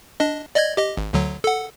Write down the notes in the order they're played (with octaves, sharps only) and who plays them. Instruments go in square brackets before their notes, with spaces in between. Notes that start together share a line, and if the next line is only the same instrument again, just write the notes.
[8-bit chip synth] D4 D#5
D5 D#5 G#6
G4 D#5
G#1
D2 D3 F#3
A4 F#5